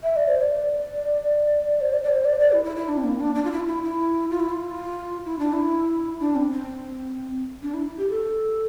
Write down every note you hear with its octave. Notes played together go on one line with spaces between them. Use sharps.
E5
D5
C5
D5
C5
D5
D5
C5
D5
D5
E4
E4
E4
D4
C4
A#3
D4
D4
F4
E4
F4
E4
E4
F4
E4
F4
E4
D4
E4
D4
C4
C4
D4
E4
G4
A4